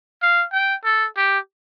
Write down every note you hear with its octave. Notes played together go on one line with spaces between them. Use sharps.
F5
G5
A4
G4